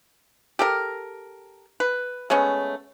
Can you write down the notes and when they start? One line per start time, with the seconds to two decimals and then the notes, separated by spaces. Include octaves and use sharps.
0.59 G4 A4 A#4
1.80 B4
2.30 G#3 A3 B3 C#4